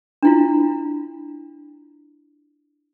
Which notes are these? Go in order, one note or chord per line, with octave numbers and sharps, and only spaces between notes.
D4 E4 F4